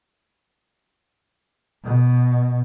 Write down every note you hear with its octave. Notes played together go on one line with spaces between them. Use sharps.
B2